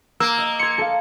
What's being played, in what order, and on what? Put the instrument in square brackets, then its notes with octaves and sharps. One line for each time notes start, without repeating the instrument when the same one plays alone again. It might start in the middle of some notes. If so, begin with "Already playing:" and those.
[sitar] A#3 [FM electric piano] E6
[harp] D#5 D#7
[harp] C6 G#6 [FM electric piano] C#7
[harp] A4 F5